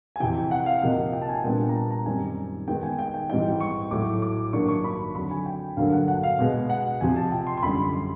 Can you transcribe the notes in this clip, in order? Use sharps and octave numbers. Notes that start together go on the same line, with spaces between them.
G#5
F2 C3 E3 G5
F#5
F5
C3 F3 A#3 D#4 F#5
G5
A5
G#5
A#2 G3 B3 D4 G5
A#5
A5
A#5
F#2 D#3 G3 C4 G#5
D#3 G#3 B3 G5
G#5
G5
G5
G#2 E3 G3 C4 D#4 G5
C#6
A2 F#3 A3 D6
D6
G2 D#3 F#3 A#3 D4 C#6
C#6
B5
F2 D3 F#3 B5
G#5
G5
G2 D3 F#3 A#3 F5
F#5
F#5
F5
B2 G#3 B3
F#5
F2 C3 F3 G#5
A5
G5
C6
C6
F#2 D3 G3 B5
C6
C6